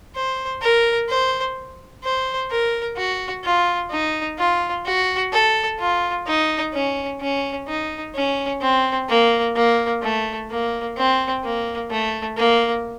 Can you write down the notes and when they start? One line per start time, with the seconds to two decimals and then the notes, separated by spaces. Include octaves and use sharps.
0.15 C5
0.62 A#4
1.09 C5
2.04 C5
2.51 A#4
2.97 F#4
3.44 F4
3.91 D#4
4.38 F4
4.85 F#4
5.33 A4
5.79 F4
6.27 D#4
6.73 C#4
7.20 C#4
7.67 D#4
8.15 C#4
8.61 C4
9.09 A#3
9.56 A#3
10.02 A3
10.50 A#3
10.97 C4
11.44 A#3
11.91 A3
12.37 A#3